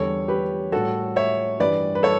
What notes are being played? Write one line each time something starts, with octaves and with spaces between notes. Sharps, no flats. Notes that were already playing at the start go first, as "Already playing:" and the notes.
Already playing: E2 D3 G3 A4 C#5
G4 B4
A2 G3 F#4 A4
C#5 E5
G2 E3 G3 B4 D5
B4
A4 C#5